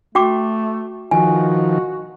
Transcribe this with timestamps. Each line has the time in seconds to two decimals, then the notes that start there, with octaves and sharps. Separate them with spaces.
0.15 A3 F#4 G5 D6
1.11 D#3 F3 F#4 G#5